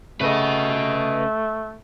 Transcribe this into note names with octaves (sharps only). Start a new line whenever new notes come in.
C#3 A3 B4 D#5